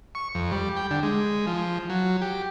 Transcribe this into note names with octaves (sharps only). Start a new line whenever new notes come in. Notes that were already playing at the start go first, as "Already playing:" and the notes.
C#6
F2
G3
G5
D3
G#3
F3
F#3
G4